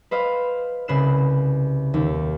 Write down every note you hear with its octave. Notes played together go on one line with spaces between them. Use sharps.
B4 C5 D#5 F5
C2 C#3 B4 F#6 C7 E7
D#2